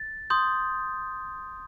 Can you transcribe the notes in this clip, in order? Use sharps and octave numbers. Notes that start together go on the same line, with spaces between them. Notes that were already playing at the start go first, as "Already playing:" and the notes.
Already playing: A6
C6 D#6 G6